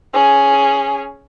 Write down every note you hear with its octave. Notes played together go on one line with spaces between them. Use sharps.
C#4 G#4